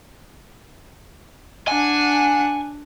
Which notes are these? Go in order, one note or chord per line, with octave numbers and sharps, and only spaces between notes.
D4 F#5 G#5